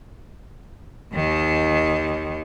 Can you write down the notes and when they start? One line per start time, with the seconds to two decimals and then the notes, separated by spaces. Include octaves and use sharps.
1.14 D#2 D#3